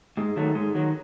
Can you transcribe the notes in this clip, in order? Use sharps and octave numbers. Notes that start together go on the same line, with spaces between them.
G#2 G#3
D#3 F#3 A3
G#2 G#3
D#3 F#3